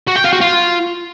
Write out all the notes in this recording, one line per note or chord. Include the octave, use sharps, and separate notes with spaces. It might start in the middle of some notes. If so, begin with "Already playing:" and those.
F#4
G5
F4
F#4
F4